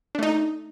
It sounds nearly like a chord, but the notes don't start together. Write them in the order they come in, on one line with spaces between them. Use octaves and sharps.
D4 A3 D#4